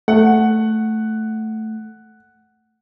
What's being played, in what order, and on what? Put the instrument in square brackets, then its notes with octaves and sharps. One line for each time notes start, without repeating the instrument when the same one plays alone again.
[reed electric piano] A3 [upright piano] F#5